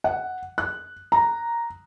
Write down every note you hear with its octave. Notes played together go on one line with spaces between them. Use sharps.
F#5
F#6
A#5